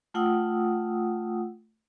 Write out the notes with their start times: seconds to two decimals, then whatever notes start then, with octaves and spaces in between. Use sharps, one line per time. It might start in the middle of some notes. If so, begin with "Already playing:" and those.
0.14 A3 F4 F#5 G5 D#6 E6